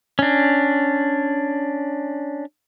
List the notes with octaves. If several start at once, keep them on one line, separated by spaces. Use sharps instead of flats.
C#4 D4